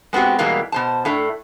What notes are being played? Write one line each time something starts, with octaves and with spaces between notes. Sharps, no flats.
G#3 B3 C4 F#4 G4
B2 E3 G3 G#3 A#3
B2 C5 A5
A2 A3 D4